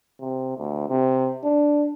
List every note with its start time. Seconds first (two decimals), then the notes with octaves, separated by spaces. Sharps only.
0.21 C3
0.57 D2
0.89 C3
1.44 D4